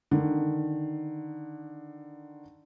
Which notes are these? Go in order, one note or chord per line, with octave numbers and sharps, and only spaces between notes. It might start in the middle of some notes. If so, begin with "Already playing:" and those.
D3 D#3